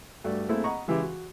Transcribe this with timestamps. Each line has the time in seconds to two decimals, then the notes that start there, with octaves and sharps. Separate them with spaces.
0.24 G2 A3 F#4 D5
0.49 A3 A#3 C4 E4 G#4 A4
0.64 D#5 F#5 A#5 B5 C#6
0.88 C#3 E3 G#3 E4 G4 G#4
1.02 F#4